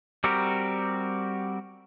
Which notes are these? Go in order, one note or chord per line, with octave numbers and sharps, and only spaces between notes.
G3 C4 F#4 G4 A#4